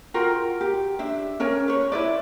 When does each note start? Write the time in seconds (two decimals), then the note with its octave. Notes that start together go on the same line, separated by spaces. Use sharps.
0.14 F4 F#4 A#4 G5
0.61 G4
0.99 D4 E5
1.40 C#4 A#4 C#5 G#5
1.68 B4 C#5
1.92 E4 B4 D5